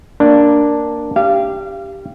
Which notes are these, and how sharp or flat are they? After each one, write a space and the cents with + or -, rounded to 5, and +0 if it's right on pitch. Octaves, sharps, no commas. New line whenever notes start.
A#3 +0 D4 +0
G4 +0 F5 -30